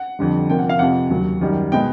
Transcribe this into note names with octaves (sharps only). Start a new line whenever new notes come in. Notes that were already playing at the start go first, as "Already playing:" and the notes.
Already playing: F#5
F2 D3 G3
C3 F3 A#3 C#4 G5
F#5
F5
F2 C3 F3 F#5
D#2 C#3 F#3
F#2 D#3 G3
B2 G#3 B3 G5